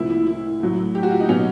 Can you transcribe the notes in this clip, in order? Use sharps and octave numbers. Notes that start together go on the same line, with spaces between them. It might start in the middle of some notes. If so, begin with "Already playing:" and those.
Already playing: C2 A#2 F3 A3 E4
E4
E4
A2 F#3 A3
G4
F#4
F4
D#4
B2 F#3 B3 C#4